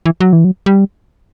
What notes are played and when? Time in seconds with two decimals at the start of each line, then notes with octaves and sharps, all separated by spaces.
0.06 E3
0.20 F#3
0.33 E3
0.45 F#3
0.66 G3